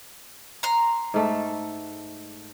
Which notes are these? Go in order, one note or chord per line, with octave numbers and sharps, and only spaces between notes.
A#5 C6
G#2 A3 A4